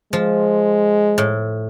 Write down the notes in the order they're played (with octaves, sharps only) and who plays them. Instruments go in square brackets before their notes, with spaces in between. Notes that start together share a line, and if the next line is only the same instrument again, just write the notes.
[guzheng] F3 [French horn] G#3
[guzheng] A2